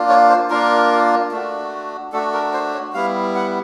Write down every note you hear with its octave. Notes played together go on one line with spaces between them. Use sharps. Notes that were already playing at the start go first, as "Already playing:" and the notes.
Already playing: A#3 D4 F4
C#5
C5
A#3 D4 F4 A#4
A3 D4 F#4
A3 D4 F#4 A4
A#4
C5
C#5
G3 B3 E4 F5
F#5